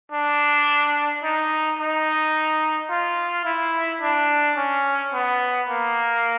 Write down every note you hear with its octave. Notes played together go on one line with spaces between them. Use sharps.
D4
D#4
D#4
F4
E4
D4
C#4
B3
A#3